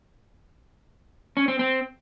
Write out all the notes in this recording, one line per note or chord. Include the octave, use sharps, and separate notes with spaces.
C#4
C4
C4